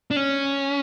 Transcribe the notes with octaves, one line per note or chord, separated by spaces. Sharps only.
D4
C#4